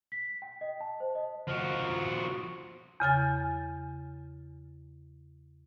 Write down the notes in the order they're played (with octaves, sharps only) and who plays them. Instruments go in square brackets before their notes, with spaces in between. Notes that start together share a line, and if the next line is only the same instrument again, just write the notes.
[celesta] B6
G5
D#5
A5
C5
D#5
[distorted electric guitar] F3 F#4
[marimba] E2 C#3 G#5 A6